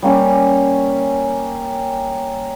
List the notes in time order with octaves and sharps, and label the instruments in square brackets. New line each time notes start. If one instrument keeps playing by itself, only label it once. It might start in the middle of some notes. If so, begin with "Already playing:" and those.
[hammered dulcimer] G3 A#3 C#4 G#5